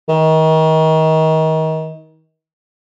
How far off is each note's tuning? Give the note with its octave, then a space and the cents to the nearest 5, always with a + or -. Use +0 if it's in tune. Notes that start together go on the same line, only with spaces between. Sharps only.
D#3 +30